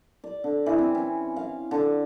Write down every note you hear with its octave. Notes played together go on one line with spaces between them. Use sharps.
D5
D3
E3
C4
C#4
F5
D3